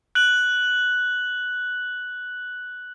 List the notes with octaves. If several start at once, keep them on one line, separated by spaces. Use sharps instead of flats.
F#6 F#7